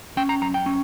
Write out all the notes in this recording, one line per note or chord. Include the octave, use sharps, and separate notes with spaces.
C#4 G5
A#5
F#2 A#5
G5
C#4